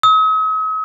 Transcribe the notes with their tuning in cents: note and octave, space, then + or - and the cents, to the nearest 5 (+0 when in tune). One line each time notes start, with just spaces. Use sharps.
D#6 +45